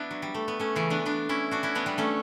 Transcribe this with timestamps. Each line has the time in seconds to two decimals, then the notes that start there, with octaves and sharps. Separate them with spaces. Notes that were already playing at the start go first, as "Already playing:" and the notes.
Already playing: B3 D4 E4
0.11 F#3
0.22 G3
0.34 A3
0.48 B3
0.60 A3 C#4
0.76 C#3 E3
0.90 B3 D4
1.05 B3 D4
1.29 C#4 E4
1.51 D4 F#4
1.63 C#4 E4
1.75 B3 D4
1.86 G3 B3
1.98 A3 C#4